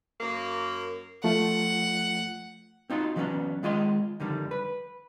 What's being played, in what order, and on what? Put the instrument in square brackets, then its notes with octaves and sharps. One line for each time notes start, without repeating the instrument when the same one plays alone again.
[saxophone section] F#2 A#3
[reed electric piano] F3 A3 F4 [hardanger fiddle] F#5
[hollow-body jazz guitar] C4 D#4 F4 F#4 C6
E3 F#3 G3 B3 C#4 D4
D#3 G#3 F4 D#5 B5 C6
F2 D3 D#3 G3
B4